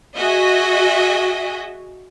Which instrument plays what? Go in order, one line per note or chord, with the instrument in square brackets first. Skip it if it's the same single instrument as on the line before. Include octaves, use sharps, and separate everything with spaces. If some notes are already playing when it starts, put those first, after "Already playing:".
[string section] F#4 G#4 D#5 E5